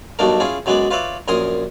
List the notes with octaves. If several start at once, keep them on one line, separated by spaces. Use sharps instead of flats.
B1 G2 B2 A3 D4 A#4
C#4 E4 F4 G#4
F#2 F#3 G#3 B3 G#4 D5
F4 B4 C#5 D5 E5
A#1 F#2 A#4 G#5 C6 D#6